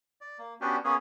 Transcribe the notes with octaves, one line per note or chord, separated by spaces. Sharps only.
D5
A#3
B3 C#4 D4 F#4 G4
A#3 B3 C#4 G#4 C#5